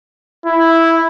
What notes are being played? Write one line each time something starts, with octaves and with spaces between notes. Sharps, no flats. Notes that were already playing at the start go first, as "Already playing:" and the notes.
E4